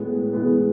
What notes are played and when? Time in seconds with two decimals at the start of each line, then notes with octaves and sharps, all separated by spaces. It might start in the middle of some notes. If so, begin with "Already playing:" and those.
Already playing: A2 G#3 B3
0.33 A2 G#3 B3